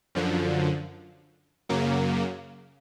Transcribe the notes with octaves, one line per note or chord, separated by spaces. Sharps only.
F#2 D3 F3
F#2 C#3 F#3 A#3